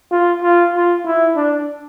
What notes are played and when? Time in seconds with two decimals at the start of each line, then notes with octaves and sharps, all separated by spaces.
0.11 F4
0.42 F4
0.74 F4
1.05 E4
1.36 D4